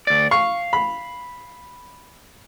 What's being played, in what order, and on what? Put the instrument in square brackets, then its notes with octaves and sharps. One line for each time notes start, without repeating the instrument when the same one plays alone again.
[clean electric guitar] D2 D5
[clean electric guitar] F5 [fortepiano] C#6
[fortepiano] B5